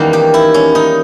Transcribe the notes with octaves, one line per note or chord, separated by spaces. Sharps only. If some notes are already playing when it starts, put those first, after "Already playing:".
Already playing: E2 D#3 G3 A#3 C#4
G4
E4
C#4
D#4